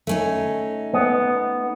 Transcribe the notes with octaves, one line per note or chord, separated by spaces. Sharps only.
A3 C#4 D#4
B3